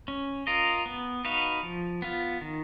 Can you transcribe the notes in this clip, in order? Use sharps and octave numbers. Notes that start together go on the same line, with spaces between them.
C#4
F4 A#4 D#5
B3
D#4 F#4 B4 F5
F3
B3 F4
D#3